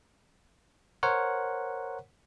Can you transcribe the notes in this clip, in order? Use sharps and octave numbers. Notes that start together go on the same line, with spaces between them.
A#4 C5 C#5 F#5